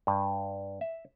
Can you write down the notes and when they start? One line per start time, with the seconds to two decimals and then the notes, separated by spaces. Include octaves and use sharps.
0.07 G2
0.81 E5